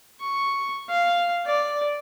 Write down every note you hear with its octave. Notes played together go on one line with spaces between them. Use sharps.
C#6
F5
D5